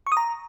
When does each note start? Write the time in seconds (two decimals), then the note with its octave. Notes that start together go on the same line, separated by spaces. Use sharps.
0.07 C#6
0.12 D#6
0.17 A#5